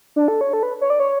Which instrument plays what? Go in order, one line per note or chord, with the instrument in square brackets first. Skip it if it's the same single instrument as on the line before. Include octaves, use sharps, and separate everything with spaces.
[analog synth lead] D4
A4
C#5
A4
B4
C#5
D5
C#5